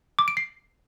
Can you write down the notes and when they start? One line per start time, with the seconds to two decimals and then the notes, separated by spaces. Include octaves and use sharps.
0.19 D6
0.28 D7
0.37 C7